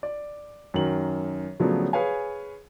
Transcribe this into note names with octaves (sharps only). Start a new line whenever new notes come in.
D5
F#2 D#3 A#4 F#7
C#3 F3 F#3 A3 B3 D4
G#4 B4 C#5 F5 G#5